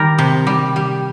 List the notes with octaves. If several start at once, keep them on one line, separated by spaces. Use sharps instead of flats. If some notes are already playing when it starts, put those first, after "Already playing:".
Already playing: D#3 G3 A#4
C3
G3
G3